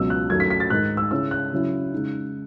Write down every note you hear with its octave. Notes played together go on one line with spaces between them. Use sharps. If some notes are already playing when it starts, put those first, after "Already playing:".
Already playing: C#2 B2 F#3 E6
F#6
F#2 D#3 F#3 A3 G#6
B6
B6
A6
G#2 D#3 G#3 D#4 F#6
E6
C#3 G#3 C#4 E4 E6
F#6
C#3 F#3 C#4 E4
C#3 G#3 D#4